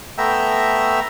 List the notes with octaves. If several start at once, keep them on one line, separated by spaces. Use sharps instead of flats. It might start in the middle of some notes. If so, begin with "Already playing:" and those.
A3 B3 E5 G5 A#5 E6